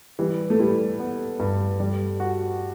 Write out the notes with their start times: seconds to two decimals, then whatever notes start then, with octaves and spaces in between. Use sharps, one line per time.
0.19 E3 G3
0.50 A3
0.59 G3 E4
0.99 B3
1.40 G2
1.80 G3
2.20 F#4